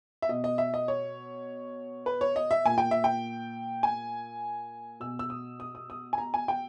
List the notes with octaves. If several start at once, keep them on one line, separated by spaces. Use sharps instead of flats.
E5
B2 D#5
D#5
E5
D#5
C#5
B4
C#5
D#5
E5
A#2 G#5
G5
E5
G5
G#5
B2 E6
E6
D#6
D#6
D#6
D#6
G#5
A#5
G#5
G5